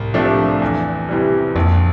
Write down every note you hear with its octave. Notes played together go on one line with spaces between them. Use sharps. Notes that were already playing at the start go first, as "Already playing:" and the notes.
Already playing: C2 A2
C3 F3 A3 D4
E2
C3 E3 G3
A#1 F2